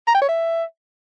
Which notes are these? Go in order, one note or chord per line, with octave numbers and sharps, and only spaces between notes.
A#5
G5
C#5
E5